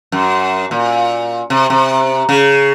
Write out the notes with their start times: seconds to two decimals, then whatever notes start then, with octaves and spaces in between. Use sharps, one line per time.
0.12 F#2
0.71 A#2
1.50 C3
1.70 C3
2.29 C#3